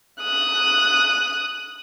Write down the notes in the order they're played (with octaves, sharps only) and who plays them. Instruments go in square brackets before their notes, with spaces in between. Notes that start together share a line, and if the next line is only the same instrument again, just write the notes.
[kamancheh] D#6 F#6